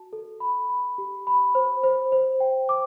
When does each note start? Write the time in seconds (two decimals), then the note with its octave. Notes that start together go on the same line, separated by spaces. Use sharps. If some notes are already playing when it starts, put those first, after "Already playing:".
Already playing: F#4 A5
0.13 A4
0.40 B5
0.70 B5
0.98 G4
1.27 B5
1.55 C5
1.84 C5
2.12 C5
2.40 G5
2.69 D6